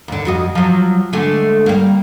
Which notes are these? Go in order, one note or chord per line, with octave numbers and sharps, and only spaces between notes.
D#2 D3
F2 F#4 D#5
F3 F#3
D3 G#3 A3
G3 A#3